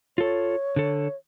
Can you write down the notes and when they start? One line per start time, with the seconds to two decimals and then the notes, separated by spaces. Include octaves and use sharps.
0.18 F4 A4 C#5
0.76 D3 A4